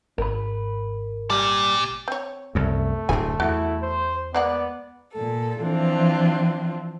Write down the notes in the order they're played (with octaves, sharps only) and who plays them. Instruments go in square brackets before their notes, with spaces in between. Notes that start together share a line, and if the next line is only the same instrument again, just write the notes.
[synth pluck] G#1 [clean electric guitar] A#4 B5
[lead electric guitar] A#2 D5 [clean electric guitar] G3
[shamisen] C4 C#5
[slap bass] C2 F#2 [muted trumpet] A3
[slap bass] D1 G2 [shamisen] C4 G#5
[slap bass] E2 [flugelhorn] E4 [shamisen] F#4
[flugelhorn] C5
[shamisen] G#3 A#3 F#5 [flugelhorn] B3 [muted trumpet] D5
[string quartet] A#2 A4
E3 F3 C4 D4 F4